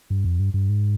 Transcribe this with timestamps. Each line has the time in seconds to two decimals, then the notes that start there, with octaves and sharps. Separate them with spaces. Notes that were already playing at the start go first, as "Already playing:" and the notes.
0.10 G2
0.24 F2
0.40 G2
0.54 G2
0.69 G#2